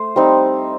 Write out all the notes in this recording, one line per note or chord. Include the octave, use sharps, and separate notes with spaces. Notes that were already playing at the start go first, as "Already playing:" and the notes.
Already playing: A3 C5
G3 C4 D#4